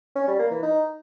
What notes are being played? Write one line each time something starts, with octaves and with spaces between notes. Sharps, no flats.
C#4
G3
A#3
E3
D#4